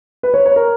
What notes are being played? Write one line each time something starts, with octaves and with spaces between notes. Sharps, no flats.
B4
C#5
C#5
A#4